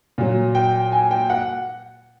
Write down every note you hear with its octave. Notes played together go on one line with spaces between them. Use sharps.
A#2 F#3
G5
G#5
G5
F#5